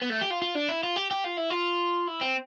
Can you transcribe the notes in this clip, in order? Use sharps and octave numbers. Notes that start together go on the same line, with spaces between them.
B3
A3
G4
F4
F4
D4
E4
F4
G4
G4
F4
E4
F4
E4
C4